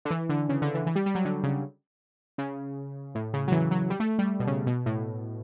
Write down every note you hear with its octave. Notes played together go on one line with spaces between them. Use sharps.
D3
E3
D3
C#3
D3
E3
E3
G3
G3
F#3
D3
C#3
C#3
A2
C#3
F#3
E3
F#3
G3
A3
G3
B2
C#3
B2
A2